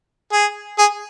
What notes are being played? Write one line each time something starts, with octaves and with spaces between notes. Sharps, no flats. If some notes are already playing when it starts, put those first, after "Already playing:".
G#4
G#4